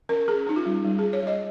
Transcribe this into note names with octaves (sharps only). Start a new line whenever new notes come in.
C#4 A#4
C#4 G#4
C#4 D#4
F4
G3
G3
G#4
G3
C#5
G3 D#5